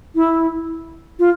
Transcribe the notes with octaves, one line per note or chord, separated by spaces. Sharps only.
E4
F4